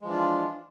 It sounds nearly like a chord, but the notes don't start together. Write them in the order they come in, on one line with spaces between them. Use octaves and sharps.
G#3 F3 E3 D4 F4